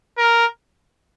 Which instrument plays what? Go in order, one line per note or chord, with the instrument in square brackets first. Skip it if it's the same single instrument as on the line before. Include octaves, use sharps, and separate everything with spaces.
[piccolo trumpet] A#4